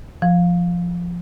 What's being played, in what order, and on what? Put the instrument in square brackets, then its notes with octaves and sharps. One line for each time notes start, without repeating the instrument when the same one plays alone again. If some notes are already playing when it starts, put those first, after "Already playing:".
[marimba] F3